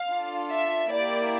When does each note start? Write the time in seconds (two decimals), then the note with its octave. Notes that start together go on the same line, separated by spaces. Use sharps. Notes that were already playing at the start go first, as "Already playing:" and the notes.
Already playing: F5
0.09 D4 F4 A4
0.49 E5
0.90 A#3 E4 G4 D5